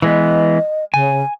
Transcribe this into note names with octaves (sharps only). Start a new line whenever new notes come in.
E3 G#3 B3 D#5
C#3 G#5